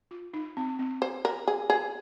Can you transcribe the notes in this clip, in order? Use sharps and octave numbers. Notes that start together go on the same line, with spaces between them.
F4
D#4
C4
C4
C5
A#4
G#4
G#4